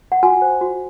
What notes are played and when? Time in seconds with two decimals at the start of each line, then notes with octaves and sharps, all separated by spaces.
0.12 F#5
0.23 F#4 G#5
0.42 C5
0.61 F#4